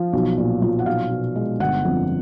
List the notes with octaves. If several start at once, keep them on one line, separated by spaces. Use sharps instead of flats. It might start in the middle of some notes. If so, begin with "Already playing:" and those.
Already playing: F3
B1
A#2
F3
F#5
B1 F5
B2
G#3
G1 F#5
F2